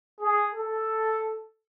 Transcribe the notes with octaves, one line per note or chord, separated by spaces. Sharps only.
G#4
A4